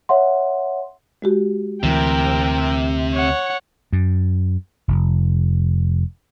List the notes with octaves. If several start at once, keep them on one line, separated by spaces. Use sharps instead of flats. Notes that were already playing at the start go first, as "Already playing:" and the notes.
C#5 E5 F#5 C6
G#3 F#4 G4
D2 C3 E3 A#4 G5
C#5 F#5
F#2
F1